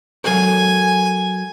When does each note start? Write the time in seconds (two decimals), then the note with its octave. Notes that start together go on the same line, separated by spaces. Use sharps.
0.24 F#3 A4 A#4 G#5